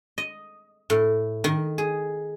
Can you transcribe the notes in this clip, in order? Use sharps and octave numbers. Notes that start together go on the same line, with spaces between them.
D#5
A2
D#3
G#4